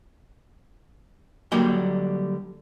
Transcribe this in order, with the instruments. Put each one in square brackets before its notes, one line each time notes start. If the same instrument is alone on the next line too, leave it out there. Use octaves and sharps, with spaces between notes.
[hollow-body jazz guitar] D3 F#3 G3 A#3 G5